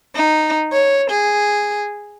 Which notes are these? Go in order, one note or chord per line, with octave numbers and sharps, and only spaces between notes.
D#4
C#5
G#4